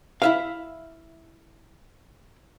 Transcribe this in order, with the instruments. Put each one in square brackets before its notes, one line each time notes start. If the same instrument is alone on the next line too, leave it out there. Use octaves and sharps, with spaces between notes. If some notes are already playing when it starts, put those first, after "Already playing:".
[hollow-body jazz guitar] E4 E5 F5